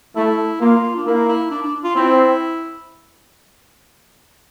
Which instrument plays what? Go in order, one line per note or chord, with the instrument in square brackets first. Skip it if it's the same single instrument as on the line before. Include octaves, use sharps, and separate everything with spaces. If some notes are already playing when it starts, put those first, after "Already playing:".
[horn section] A3 [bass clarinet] E4
[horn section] A#3 [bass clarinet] F4
[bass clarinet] D4
[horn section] A#3 [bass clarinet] E4
[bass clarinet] E4
D4
D4
F4
[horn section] C4 [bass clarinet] E4